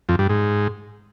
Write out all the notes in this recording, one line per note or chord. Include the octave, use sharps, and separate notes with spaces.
F2
G2
G#2